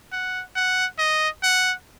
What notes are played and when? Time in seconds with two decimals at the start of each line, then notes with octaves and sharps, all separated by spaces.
0.12 F#5
0.55 F#5
0.99 D#5
1.43 F#5